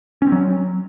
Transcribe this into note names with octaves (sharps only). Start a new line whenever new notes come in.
C#4
C4
F#3